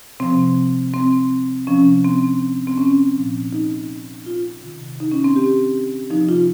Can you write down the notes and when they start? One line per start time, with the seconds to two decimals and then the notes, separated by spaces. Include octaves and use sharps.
0.20 C3 F3 C4
0.94 C4
1.67 C3 F3 C#4
2.05 C4
2.67 C4
2.77 C#4
3.15 A#2 F3
3.53 D#4
4.26 F4
4.62 C3 D#3
5.00 D#4
5.11 C#4
5.24 C4
5.36 G4
6.10 F3 D#4
6.14 C3
6.29 F4